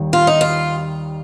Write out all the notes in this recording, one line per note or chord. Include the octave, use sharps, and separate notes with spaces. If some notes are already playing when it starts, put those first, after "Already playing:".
Already playing: D#2 D#3 G3
F4
D#4
F4